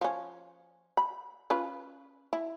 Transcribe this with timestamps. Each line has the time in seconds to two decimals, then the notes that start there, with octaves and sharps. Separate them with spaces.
0.01 F3 C#4
0.97 B5
1.50 C#4 F4 B4
2.33 E4